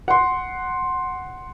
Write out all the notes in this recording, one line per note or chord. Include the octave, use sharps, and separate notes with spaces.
F#5 C6